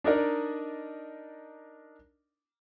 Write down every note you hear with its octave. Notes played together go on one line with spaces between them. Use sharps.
D4 D#4 A#4 D5 D#5